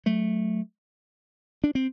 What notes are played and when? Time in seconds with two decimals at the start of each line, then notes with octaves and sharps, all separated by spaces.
0.06 F#3 A3
1.64 D4
1.75 C4